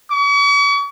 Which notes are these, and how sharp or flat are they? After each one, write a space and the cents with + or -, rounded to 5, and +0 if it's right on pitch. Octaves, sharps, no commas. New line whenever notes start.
C#6 +45